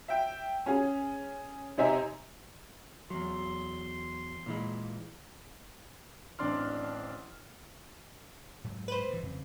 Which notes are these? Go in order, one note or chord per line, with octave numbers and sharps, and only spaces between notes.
E5 G5
C#4 G#4
C3 C4 D#4 E5 G#5 A#5
E2 F#3 C6
A#2 E3 G#3
A1 C4 D4 D5 C6 F6
G#2 F#3
B4 C5
G2 E3
F2 C#3 C4